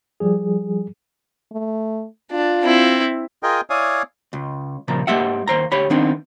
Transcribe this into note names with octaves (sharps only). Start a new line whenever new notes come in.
F3 G3 G#4
A3
D4 F4
C4 E4
F4 G#4 A#4 D#5 G5
E4 C#5 D5 F5 G#5 D#6
C#2
A#2 C#3 F3 A#5
G#2 G#3 A#3 G4 E5 F#5
D#2 C5 A#5
D2 G4 C#5 B5
D#3 B3 C4 D4 D#4